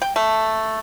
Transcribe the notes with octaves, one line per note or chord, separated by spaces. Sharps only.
G5
A3